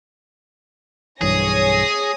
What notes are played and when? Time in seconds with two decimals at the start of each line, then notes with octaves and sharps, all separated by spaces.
1.21 B1 G2 E3 G#4 C#5 G#5 D#6 A#6